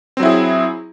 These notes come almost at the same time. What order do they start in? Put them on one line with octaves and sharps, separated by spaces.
C4 F#3 E4 G#4